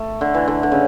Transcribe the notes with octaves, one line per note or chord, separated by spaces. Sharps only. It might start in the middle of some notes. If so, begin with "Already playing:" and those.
Already playing: A3
D3
E3
D3
D3
C#3